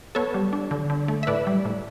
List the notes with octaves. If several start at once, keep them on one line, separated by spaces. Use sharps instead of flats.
B3 A4 C#5
G3
D4
D3
D3
A3
E5
A2 B4 D5
G3
A2